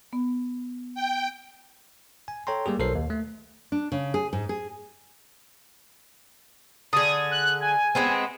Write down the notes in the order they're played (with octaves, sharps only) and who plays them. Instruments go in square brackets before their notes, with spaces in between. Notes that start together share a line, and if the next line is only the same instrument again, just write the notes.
[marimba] B3
[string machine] G5
[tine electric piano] G#5
A4 C#5 G5 A#5 C6
G3 A#3 G4 G#4
B1 A4 A#4 C5 C7
D#2
A3
[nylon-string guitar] D4
C#3
G#4
G#2
G#4
[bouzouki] D3 G#4 [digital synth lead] D#6
[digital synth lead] F#6
G#5
[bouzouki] G#3 B3 C4